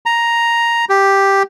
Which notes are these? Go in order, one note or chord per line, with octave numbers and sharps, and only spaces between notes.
A#5
G4